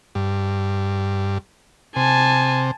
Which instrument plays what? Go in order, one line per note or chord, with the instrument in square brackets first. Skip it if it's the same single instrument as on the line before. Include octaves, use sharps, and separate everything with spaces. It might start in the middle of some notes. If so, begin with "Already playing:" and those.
[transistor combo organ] G2
[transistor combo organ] C3 [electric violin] G#5 A5